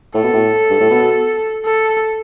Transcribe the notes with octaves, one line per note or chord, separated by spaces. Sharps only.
A2 A4
B2
A2
G2
A2
B2
A4